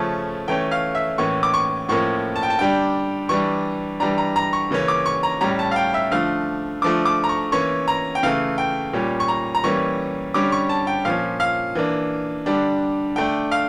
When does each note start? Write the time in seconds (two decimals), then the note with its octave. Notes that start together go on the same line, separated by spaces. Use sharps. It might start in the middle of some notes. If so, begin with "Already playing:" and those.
Already playing: C#3 F3 A3 C#4 A5
0.48 E3 A3 C#4 G5
0.71 F5
0.95 E5
1.18 A2 E3 A#3 C#4 C#6
1.43 D6
1.54 C#6
1.89 A2 F3 A#3 C#4 C#6
2.36 A5
2.43 G5
2.50 A5
2.59 D3 G3 D4 G5
3.29 E3 G3 D4 C#6
4.00 E3 G3 D4 A#5
4.18 A#5
4.36 A#5
4.53 C#6
4.71 C#3 E3 A#3 C#4
4.88 D6
5.06 C#6
5.23 A#5
5.41 A2 G3 C#4 A#5
5.59 A5
5.71 F5
5.76 G5
5.94 E5
6.11 D3 F3 A3 F5
6.82 D3 F3 A3 D6
7.05 D6
7.24 A#5
7.29 C#6
7.52 E3 A#3 C#4 C#6
7.88 A#5
8.15 G5
8.23 C#3 E3 A3 F5
8.58 G5
8.93 A#2 G3 C#4
9.20 C#6
9.28 A#5
9.55 A#5
9.64 E3 G3 A#3 C#4 C#6
10.34 D3 G3 C#4 D6
10.52 C#6
10.69 A5
10.87 G5
11.05 A#2 F3 C#4 F5
11.40 F5
11.75 E3 A#3 D4
12.46 D3 G3 D4
13.16 D3 A3 D4 G5
13.51 F5